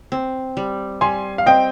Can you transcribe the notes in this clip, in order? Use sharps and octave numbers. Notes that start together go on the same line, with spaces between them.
C4
G3
G3 G#5 C6
F5
C4 D#5 G5